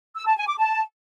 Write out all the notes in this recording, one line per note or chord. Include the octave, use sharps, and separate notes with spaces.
E6
A5
G#5
D6
A5